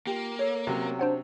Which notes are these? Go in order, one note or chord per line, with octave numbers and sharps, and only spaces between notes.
A#3 F4 G4
A4 C#5
C3 F#3 C#4
D4 C5 F#5